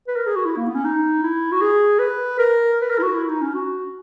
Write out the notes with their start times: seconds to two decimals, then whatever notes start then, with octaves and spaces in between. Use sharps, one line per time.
0.08 B4
0.16 A#4
0.27 G#4
0.36 F#4
0.46 E4
0.57 A#3
0.66 B3
0.75 C#4
0.84 D#4
1.23 E4
1.52 F#4
1.62 G#4
1.99 B4
2.39 A#4
2.82 B4
2.90 A#4
2.98 E4
3.02 F#4
3.15 E4
3.29 D#4
3.42 C#4
3.55 F#4